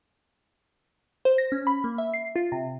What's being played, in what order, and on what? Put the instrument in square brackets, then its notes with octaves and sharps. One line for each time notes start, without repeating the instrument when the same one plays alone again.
[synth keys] C5
A#6
C#4
B5
A#3
E5
C7
F4
C3